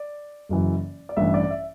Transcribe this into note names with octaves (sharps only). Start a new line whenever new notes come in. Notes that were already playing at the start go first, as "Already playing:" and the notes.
Already playing: D5
F#1 F#2 E3
D5
A1 G2 E3 E5
D5
E5